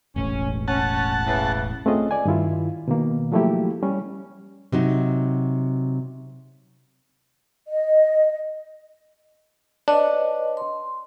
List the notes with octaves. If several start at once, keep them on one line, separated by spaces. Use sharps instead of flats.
E1 A1 C#4
C#4 F#5 A5
C#3 E3
A3 C4 C#4 F4 G#4 D#5
D5 G#5
G2 D#3 E4 F4
B2 D#3 A#3
F3 F#3 A3 A#3 E4 G4
G3 C#4
C3 F#3 D#4
D#5
D4 B4 C#5 D#5
C6